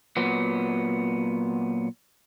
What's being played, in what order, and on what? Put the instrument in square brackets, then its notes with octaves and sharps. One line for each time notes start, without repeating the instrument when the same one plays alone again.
[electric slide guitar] A#2 F#3 B3